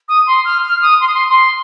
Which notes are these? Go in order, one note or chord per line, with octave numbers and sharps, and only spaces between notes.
D#6
C6
F6
F6
D#6
C6
D#6
C6
C6